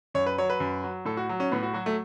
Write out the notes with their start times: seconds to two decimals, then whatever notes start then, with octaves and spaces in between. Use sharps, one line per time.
0.14 F#2 C#5
0.26 B4
0.38 F#3 C#5
0.50 B4
0.60 F#2
0.83 F#3
1.05 A2 A4
1.17 F#4
1.29 F#3
1.40 C#4
1.51 A2 B3
1.63 F#4
1.74 F#3 F#4
1.86 A3